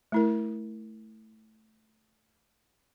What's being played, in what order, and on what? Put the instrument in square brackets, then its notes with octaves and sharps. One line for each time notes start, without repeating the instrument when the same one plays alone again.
[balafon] A3 E4 A#4